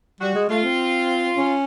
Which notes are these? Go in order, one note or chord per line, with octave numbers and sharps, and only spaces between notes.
G3 F#4
G#3
A3 F4
C4
C#4